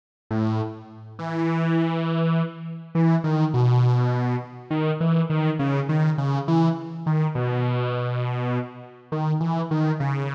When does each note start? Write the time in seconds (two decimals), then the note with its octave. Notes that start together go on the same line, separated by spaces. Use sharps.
0.31 A2
1.19 E3
2.95 E3
3.24 D#3
3.54 B2
4.71 D#3
5.00 E3
5.30 D#3
5.59 C#3
5.89 D#3
6.18 C#3
6.48 E3
7.06 D#3
7.35 B2
9.12 D#3
9.40 E3
9.71 D#3
10.00 C#3